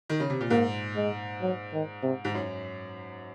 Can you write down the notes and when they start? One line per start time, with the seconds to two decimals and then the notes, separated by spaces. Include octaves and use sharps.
0.09 D#3
0.20 C#3
0.30 C3
0.41 A#2
0.50 G#2 A#3
0.96 G#3
1.42 F#3
1.73 D#3
2.03 C3
2.25 G#2
2.35 F#2